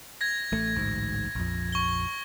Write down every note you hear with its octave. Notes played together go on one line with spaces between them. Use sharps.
G#6 A#6
A1 A3
A1 D2 G#2
A#1 F2
C#6 G7